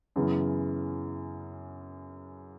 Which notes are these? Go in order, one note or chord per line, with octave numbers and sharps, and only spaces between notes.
F#2 C#3 E3 B3